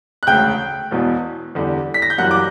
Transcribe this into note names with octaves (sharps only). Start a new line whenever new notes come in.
F#6
E1 D2 C#3 G5 G6
E1 E2 B2
E2 D3 G3
B6
A#6
G6
F#1 F#2 E3 G3 F#5 F#6
D6